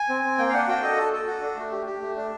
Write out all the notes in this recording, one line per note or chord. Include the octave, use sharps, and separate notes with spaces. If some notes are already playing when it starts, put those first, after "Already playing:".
Already playing: G#5
C4
C4
A#3 G5
F5
D4 F#5
F#4 G5
A4 D#5
A4
A4
F#4
D4
A3
G4
G4
A3
D4